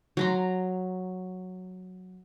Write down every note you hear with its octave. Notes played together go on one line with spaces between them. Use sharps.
F#3 A#5 C6